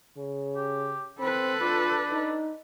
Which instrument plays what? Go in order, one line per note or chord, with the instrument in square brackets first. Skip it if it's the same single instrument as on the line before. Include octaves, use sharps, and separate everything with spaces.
[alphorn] C#3
[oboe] G4
[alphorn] C4 [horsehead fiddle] A4 B4 [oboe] B5
[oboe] D4 [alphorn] F4
[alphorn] D#4